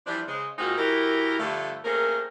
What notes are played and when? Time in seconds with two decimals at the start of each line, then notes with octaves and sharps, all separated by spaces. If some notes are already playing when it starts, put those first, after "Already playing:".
0.06 E3 F3 G3 D4
0.27 C#3 G#3 C5
0.58 A#2 G#3 C4 D#4 F4 F#4
0.77 E3 E4 F#4 G4 A#4
1.38 G2 D3 F3 A3
1.83 A3 A#3 C4 C#4 G#4 A#4